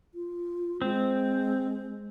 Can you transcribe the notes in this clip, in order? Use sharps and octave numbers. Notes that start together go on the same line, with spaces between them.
F4
G#3 C4